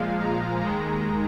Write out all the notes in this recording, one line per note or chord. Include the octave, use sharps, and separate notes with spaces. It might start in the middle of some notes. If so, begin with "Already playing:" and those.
Already playing: A#2 F3 G#3 F5
A#5
D#2 D#3 G#3 A#5